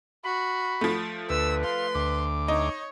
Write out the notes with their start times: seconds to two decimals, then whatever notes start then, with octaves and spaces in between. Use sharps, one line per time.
0.25 F#4 B5
0.81 F3 A3
1.30 D2 B4 E6
1.64 F5 C6
1.95 D2 D6
2.48 D#4 C#5